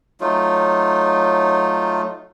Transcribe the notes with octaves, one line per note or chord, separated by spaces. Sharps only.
F#3 A3 D#4 F4